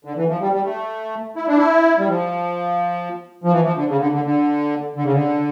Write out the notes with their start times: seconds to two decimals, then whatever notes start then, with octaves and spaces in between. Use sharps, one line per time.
0.05 D3
0.16 E3
0.29 F3
0.40 G3
0.52 G3
0.64 A3
1.36 E4
1.47 D4
1.57 E4
1.98 G3
2.08 F3
3.44 F3
3.52 E3
3.64 F3
3.76 D3
3.88 C#3
4.00 D3
4.12 D3
4.24 D3
4.96 D3
5.04 C#3
5.13 D3